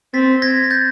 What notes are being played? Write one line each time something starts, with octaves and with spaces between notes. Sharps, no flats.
C4 A6 B6
G#6 A#6
G6 A6